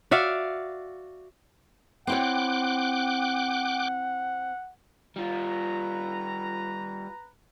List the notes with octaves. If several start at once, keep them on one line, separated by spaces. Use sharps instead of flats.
F#4 D5 E5 F5
C4 E4 C#5 F#5 G5 D6 F#6
G3 F4 B4 A#5